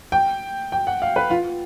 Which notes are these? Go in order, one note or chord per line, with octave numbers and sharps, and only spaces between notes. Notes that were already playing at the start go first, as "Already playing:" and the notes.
G5
G5
F#5
F5
B4
F4